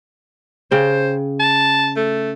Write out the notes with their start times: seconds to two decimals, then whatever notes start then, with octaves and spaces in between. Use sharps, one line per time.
0.71 C#3 C5 G5
1.40 A5
1.96 A3